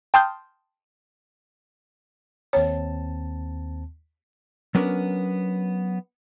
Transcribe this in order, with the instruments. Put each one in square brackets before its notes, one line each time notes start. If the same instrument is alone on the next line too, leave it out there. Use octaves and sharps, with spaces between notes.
[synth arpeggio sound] G5 A5 C6 D#6 F6 G6
[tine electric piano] D#2 C4 A5 [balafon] C#5
[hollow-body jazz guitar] F#3 B3 C#4 D4 A#4